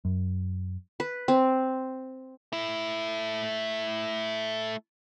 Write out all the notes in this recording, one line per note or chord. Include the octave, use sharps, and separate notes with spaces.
F#2
B4
C4
A3 E4